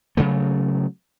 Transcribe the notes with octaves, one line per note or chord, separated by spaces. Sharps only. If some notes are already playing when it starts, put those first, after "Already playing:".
C#3 F#3 A3